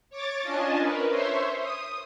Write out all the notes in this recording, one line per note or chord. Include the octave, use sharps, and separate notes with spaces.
C#5 D6 A6
C#4 D4 F4 D#5 G#5 A5
A#4 B4
C5 C#5 E5 C6
D#6